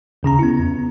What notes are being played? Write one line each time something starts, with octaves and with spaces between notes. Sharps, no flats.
D#2 C#3 C#4 A#5
B3 E4
E2 B3